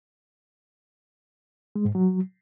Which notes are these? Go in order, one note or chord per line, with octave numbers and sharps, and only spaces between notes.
G#3
G#2
F#3